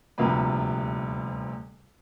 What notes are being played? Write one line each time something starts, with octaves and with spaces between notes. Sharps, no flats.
D#1 D2 C3 F3 A#3 B4